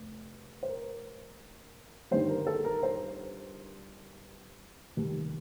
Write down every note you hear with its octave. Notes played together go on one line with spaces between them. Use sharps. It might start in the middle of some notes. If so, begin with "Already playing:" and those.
Already playing: F1
C5
A#4
G1 G2 D#3 G3 C5
A#4
A4
A#4
C5
F1 D#2 D#3 G3